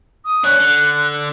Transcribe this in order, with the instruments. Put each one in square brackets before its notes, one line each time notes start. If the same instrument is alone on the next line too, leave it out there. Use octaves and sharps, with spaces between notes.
[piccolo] D#6
[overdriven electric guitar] D4 C#5 [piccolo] F#6
[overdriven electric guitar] D3